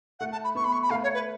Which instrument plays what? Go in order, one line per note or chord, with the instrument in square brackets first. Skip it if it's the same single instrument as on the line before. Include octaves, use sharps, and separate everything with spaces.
[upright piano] A3 [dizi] F#5
[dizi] A5
B5
[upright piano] B3 [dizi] C#6
[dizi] B5
C#6
B5
[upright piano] A3 [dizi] F5
[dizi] C#5
B4